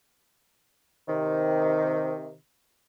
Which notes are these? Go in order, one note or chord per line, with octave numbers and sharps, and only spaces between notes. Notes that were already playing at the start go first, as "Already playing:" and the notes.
C3 D#3